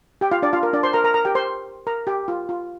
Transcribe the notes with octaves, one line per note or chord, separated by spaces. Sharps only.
G4 G5
F4 F5
D4 D5
F4 F5
A#4
D4 D5
C5 C6
A#4 A#5
A#4 A#5
A#4 A#5
G4 G5
C5 C6
A#4 A#5
G4 G5
F4
F4